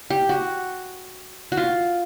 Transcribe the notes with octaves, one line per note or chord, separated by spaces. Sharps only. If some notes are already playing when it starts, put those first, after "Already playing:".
G4
F#4
F#4
F4